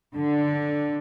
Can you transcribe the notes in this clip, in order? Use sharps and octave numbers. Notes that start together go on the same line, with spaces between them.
D3